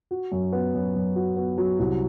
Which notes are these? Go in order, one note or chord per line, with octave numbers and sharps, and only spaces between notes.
F#4
F#2
B3
F#2
F#2
F#4
B3
F#3
C2